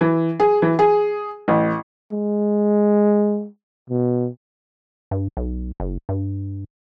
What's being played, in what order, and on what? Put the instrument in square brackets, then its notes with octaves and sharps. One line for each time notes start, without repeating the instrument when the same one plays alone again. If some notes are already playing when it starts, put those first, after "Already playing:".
[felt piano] E3
G#4
E3
G#4
A1
[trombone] G#3
B2
[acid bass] G2
B1
F#1
G2